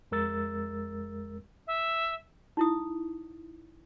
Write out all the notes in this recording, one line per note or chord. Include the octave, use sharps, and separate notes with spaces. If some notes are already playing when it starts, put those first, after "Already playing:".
F2 G#3 A#4 E6 A6
E5
D#4 E4 D#6